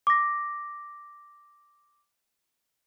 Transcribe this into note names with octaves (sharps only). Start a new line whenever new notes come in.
D6 A#6